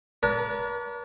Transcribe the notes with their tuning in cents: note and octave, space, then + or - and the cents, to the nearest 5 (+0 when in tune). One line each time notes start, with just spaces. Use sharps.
B4 -45 D5 -40 A5 +40